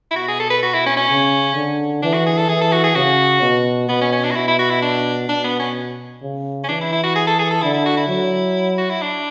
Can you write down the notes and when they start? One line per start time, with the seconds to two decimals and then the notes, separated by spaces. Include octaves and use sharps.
0.11 E4
0.15 B2 F#4
0.28 G#4
0.40 A4
0.50 B4
0.62 F#4
0.74 E4
0.86 C#4
0.97 C#4
1.10 C#3
1.55 D3
2.03 E3 D4
2.14 F#4
2.26 G#4
2.37 A4
2.49 E3 G#4
2.61 A4
2.72 F#4
2.84 G#4
2.95 C#3 F#4
3.42 B2
3.88 B2 B3
4.01 C#4
4.12 C#4
4.23 D4
4.31 F#4
4.35 B2 E4
4.48 E4
4.59 F#4
4.70 E4
4.82 D4
5.29 B2 D4
5.44 B3
5.60 C#4
6.23 C#3
6.64 C#4
6.68 E3 D4
6.81 E4
6.92 E4
7.03 F#4
7.15 G#4
7.27 A4
7.39 G#4
7.50 A4
7.62 D3 E4
7.74 E4
7.86 F#4
7.97 E4
8.08 F#3
8.78 F#4
8.90 E4
9.02 D4